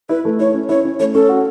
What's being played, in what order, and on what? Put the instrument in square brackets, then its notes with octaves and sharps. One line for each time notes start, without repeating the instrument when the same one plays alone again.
[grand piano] E4 [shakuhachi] B4
[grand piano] A3
[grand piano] E4 [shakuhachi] C#5
[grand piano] C#4
[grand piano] E4 [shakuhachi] C#5
[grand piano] C#4
[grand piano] A3 [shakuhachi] C#5
[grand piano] C#4 [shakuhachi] A4
[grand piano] F#4